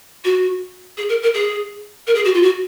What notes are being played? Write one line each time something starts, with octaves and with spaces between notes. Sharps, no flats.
F#4
G#4
A#4
A#4
G#4
A#4
G#4
F#4
F4
F#4